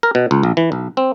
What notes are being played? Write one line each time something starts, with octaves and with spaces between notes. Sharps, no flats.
A#4
B2
C#2
A#1
E3
B1
C4